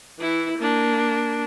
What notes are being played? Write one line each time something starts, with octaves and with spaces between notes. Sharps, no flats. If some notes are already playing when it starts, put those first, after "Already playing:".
E3 E4
A#3 D4